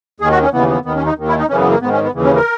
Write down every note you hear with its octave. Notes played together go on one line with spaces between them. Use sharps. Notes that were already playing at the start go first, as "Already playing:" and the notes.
D#2 D#3 G#4
F#4
C#4
D#2 C#3 E3 B3
B3
D#2 D#3 B3
C#4
D#4
D#2 D#3
E4
D#4
F#2 C#3 E3 C#4
B3
A#3
G#2 D#3 B3
C#4
B3
D#2 C#3 E3
C#4
A#4